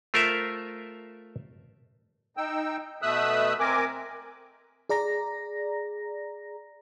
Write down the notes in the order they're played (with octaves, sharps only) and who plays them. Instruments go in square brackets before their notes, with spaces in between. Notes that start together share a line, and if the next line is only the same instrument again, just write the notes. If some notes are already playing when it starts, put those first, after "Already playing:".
[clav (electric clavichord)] A3 F4 A#4 C5 E5
[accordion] D#4 G5 E6
B2 A3 E5 D#6 E6 F#6
C4 A#4 G#5 D6
[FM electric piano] G#4 D5 A#5 A#6